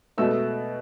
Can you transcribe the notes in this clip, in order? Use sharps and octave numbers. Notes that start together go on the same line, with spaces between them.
B2 A3 E6